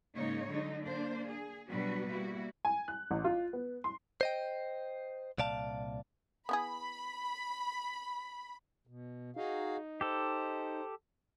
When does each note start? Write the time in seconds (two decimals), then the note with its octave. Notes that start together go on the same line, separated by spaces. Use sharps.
0.15 G#2 C#3 A#3 D#4 C#5
0.50 D3 F#3 G#3 D#4
0.84 A#3 D4 C5
1.27 G#4
1.67 B2 F#3 G3 D4 F#4 B4
2.09 G3 A#3 E4 F#4
2.65 G#5
2.88 F#6
3.11 A1
3.24 F4
3.53 B3
3.84 C6
4.21 C5 D#5 G5
5.38 C2 A#2 D5 F5 A5
6.49 B3 E4 G#4 B5
8.87 B2
9.36 D#4 F#4 G#4 F5
10.01 G4 A4 C5